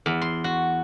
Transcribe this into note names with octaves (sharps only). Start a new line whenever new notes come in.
E2
C6
F#4